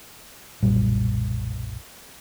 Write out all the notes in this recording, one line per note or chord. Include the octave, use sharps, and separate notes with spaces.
F#1 B1 A#2 G3